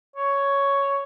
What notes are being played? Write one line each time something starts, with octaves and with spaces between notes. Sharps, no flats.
C#5